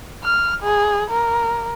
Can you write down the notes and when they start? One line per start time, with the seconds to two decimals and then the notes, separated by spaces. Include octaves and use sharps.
0.24 F6
0.62 G#4
1.10 A#4